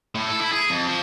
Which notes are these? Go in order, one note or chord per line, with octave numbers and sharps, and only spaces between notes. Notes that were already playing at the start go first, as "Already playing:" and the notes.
A2
A4
E4
G#4
F2
F3